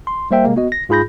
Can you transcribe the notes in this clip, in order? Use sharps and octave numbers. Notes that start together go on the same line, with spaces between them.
C6
G3 A#3 C5 E5 G5
C3 G#3 A#3
B3 F#4 D#5
A#6
G#2 F4 G#4 B5 G6 A#6